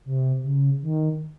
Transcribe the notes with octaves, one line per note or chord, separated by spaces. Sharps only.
C3
C#3
D#3